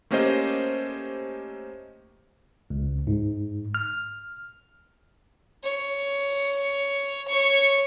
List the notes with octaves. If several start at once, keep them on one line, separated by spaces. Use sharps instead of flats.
A3 A#3 C#4 G4 C5 D#5
C#2
G#2
F6
C#5
C#5 C#6